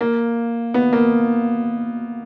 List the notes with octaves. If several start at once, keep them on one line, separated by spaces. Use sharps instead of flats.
A#3
B3
A#3